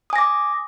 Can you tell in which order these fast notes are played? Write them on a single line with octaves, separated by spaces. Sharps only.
D#6 G#5 A#6 D6